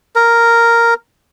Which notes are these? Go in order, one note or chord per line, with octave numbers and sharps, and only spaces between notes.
A#4